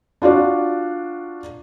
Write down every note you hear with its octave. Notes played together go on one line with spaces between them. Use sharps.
D4 F4 F#4 D5